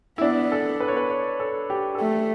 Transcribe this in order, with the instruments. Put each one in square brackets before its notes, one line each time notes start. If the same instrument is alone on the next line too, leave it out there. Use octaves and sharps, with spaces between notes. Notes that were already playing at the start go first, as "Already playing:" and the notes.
[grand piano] E4
[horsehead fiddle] B3 [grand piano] D4
[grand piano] A4
B4
C#5
B4
C#5
A4
G4
A4
[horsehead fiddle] A3 [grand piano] G4